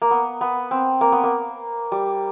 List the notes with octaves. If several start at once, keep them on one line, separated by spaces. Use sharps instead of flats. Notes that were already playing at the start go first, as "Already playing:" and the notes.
A#3
B3
B3
C4
A#3
B3
A#3
G3